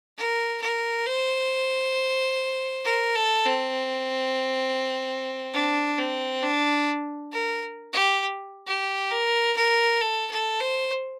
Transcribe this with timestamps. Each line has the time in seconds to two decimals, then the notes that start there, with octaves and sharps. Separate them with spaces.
0.17 A#4
0.62 A#4
1.06 C5
2.85 A#4
3.15 A4
3.45 C4
5.54 D4
5.98 C4
6.43 D4
7.32 A#4
7.93 G4
8.67 G4
9.11 A#4
9.56 A#4
10.01 A4
10.31 A4
10.60 C5